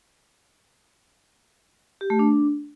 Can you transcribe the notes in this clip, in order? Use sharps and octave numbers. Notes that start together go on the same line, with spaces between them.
G4
A3
D4